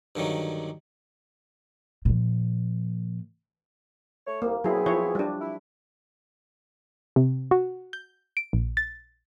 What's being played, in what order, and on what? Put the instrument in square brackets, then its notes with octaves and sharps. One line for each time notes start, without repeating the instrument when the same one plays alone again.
[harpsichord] G2 D3 D#3 F#3
[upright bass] A#2 F3
[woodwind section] A3 C#5
[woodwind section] C2 [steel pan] A#3
[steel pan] F#3 E4 [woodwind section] B3 C4 G#4
[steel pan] F3 E4 C#5
G3 D4
[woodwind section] E4
[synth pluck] C3
F#4
G6
D7
A#1
A6